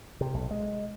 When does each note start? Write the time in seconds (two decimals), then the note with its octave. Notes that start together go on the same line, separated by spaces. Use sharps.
0.21 C3
0.34 B1
0.51 G#3